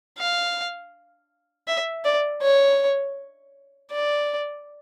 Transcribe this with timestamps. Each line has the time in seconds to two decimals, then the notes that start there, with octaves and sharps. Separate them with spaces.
0.18 F5
1.68 E5
2.05 D5
2.42 C#5
3.92 D5